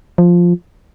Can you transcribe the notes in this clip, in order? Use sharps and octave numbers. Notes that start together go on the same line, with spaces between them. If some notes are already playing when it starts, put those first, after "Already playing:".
F3